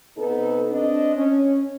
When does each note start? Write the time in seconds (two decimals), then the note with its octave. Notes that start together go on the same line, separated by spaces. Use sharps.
0.17 C3 B3 D#4 A4
0.70 C4 D4 D#5
1.16 C#4